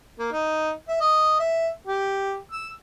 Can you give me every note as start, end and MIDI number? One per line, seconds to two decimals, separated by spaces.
0.19 0.27 58
0.32 0.71 63
0.88 0.96 76
1.00 1.34 75
1.39 1.68 76
1.87 2.36 67
2.51 2.69 88